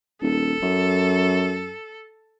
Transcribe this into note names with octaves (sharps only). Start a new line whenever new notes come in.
D#1 A4
F#2